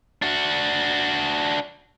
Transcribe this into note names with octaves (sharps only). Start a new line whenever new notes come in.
D4 F#4